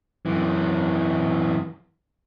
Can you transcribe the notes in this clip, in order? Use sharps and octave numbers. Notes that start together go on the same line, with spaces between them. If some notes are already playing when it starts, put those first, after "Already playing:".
F#2 E3